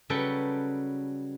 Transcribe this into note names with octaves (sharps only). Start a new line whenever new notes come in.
C#3 F#3 G3 A4 B4 G5